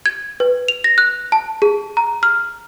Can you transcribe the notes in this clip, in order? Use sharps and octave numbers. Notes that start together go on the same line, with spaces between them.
G#6
B4
F7
A#6
F#6
A5
G#4
A#5
F6